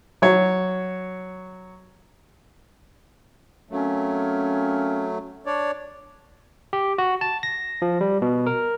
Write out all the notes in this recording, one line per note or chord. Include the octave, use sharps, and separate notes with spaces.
F#3 C#5
F#3 A3 A#3 C4 C#4
D4 C#5 D5
G4
F#4
A5
A#6
F3
G3
B2
A#4